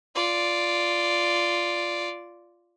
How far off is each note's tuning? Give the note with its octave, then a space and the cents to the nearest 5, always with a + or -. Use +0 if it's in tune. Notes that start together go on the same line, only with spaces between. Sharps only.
F4 -5 D5 +0